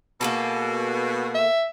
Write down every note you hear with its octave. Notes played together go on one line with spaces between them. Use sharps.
B2 A#3 G#4 A4
E5